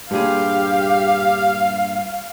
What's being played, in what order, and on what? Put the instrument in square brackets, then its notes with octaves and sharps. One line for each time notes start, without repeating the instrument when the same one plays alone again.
[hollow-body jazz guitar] G2 A#2 G#4 [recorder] G4 [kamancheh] F5